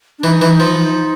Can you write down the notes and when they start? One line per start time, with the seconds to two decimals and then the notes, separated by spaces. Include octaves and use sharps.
0.19 D4
0.23 E3 D#4
0.41 E3
0.60 F3
0.78 D#4